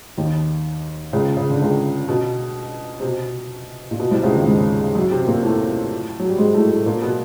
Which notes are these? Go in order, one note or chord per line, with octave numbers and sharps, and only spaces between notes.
D#2 D#3
C#2 C#3
C#3
D3
C#2 C#3
B2
C3
B2
A#2
B2
C2 C3
C#2 C#3
D#2 D#3
G#2 G#3
F#2 F#3
C3 C4
A#2 A#3
A2 A3
F#3
G3
G#2 G#3
A2 A3
A2 A3
A#2 A#3
B2 B3